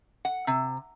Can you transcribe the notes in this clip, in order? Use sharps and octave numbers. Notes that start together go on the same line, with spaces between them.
F#5
C3